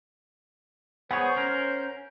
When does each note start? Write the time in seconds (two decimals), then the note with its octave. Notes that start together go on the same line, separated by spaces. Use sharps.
1.11 B3 G#4 C5 C#5 F#5
1.36 C#4 A#4